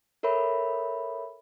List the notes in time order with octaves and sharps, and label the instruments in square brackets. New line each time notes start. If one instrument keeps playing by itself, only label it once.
[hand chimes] A4 A#4 C#5 E5 B5